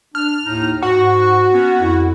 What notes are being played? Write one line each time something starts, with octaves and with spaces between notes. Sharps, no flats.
D4 F6
D#2 A2 D#4
G#2 F#4 C#6
B3 C#4
F2 E4